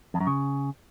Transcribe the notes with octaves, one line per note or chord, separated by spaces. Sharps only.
F2
F#2
C#3